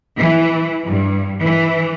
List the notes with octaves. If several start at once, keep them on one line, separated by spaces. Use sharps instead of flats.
E3
G2
E3